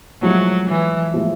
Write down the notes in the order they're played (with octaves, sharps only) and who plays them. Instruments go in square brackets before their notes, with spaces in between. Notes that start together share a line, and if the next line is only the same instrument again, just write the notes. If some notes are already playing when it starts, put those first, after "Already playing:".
[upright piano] A2 F3 G#3 [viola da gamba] F#3
[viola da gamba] E3
[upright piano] A2 F3 G#3